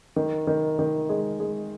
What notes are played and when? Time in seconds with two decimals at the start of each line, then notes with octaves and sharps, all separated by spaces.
0.16 D#3
0.47 D#3
0.79 D#3
1.09 G#3
1.40 G#3